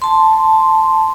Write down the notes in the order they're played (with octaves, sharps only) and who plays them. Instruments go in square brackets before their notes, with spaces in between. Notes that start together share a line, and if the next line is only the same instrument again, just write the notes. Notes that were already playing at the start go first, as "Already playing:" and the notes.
[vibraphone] A5 C6